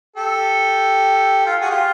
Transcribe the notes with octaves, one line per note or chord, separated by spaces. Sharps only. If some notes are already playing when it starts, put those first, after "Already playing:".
G4 A4
F4 G4
F#4 G#4
F4 G4